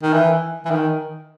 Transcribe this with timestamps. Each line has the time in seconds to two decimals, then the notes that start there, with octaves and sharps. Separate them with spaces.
0.03 D#3
0.13 E3
0.65 E3
0.70 D#3